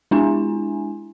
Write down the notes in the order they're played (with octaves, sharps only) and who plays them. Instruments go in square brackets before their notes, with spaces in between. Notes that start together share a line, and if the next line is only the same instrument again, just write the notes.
[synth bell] G#3 D4 E4 G#5